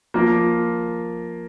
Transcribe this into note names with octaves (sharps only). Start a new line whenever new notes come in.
F3 A#3 F4 A#4